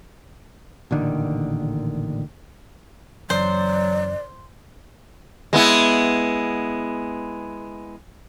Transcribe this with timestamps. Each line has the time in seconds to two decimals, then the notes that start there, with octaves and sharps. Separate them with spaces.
0.91 A1 A#2 D3 D#3
3.30 F#1 F#2 E3 F#3 C5 D5
5.53 G#3 B3 E4